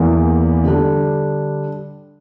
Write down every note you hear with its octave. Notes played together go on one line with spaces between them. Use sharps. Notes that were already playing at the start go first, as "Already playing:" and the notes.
Already playing: E2 E3 A#3
D3 G3 D4